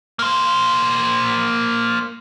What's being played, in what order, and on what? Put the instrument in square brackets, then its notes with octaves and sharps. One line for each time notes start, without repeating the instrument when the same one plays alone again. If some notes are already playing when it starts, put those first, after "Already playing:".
[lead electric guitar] A#3 C5